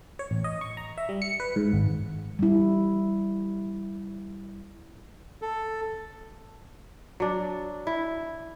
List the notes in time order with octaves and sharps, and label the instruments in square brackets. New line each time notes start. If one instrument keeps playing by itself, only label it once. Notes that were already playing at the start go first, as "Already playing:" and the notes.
[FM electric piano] C#5
A1
D#5
C#6
A#5
E5
G3
C#7
B4
G#2
G#1
[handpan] G3 E4
[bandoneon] A4
[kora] F#3 D4
E4